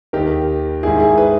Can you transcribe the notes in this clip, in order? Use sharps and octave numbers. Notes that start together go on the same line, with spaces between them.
D#2 D#3 G4 A#4
G#2 D#3 E4 G#4
E4 G#4
G#4 B4